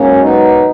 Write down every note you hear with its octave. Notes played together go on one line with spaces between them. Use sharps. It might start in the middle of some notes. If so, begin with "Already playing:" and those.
Already playing: G#2 D#3 F#3 A#3 C#4
B3 D#4